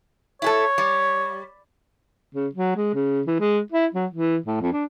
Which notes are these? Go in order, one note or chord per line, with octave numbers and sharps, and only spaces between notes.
E4 G#4 A4 C#5
G3
C#3
F#3
G#3
C#3
E3
G#3
E4
F#3
E3
A2
F2
D4